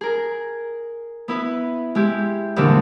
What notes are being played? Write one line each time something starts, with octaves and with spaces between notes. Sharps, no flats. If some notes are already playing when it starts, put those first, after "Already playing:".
G#4 A#4
B3 E4 B4
G#3 E4 G4
E2 G2 A#2 D3 C4 D4